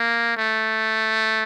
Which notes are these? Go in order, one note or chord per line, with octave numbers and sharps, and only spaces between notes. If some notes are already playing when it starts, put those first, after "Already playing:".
Already playing: A#3
A3